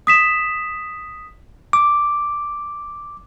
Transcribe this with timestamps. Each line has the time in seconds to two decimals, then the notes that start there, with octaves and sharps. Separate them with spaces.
0.07 D#6 B6 E7
1.73 D6